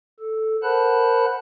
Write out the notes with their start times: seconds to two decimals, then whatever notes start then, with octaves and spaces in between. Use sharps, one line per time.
0.20 A4
0.63 A#4 C5 F#5 A5 B5 F#6